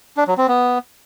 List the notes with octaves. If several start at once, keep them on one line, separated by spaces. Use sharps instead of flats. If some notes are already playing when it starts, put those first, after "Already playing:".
D4
F#3
C4
B3